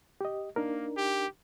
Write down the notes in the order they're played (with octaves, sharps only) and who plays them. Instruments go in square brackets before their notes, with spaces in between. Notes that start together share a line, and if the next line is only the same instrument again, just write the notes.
[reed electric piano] G4 D#5
[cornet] A#3 [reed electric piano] D4 D#4 A#4
[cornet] G4